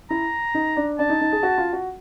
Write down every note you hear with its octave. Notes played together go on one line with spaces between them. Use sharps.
E4 A#5
D#4
D4
D4 A5
D#4
D#4
G#4
F#4
F4
F#4